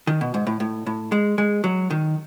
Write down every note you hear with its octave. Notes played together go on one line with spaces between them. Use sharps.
D#3
B2
G#2
A2
A2
A2
G#3
G#3
F#3
D#3